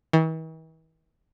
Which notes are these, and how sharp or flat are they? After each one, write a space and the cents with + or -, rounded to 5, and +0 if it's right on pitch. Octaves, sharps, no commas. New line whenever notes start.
E3 -45